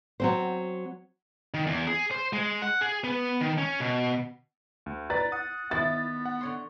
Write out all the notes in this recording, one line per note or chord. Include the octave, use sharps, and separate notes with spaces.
F#3 C4 C5
D#3
E2
G#4
C5
G#3
F#5
G#4
B3
D#3
C#4
B2
D2
B4 D5 A#5 A6
F#5 D#6
D#3 B3 E4 A6
F#5
D3 C#5 C6